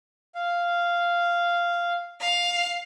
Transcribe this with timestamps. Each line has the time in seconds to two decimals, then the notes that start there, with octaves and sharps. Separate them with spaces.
0.35 F5
2.21 F5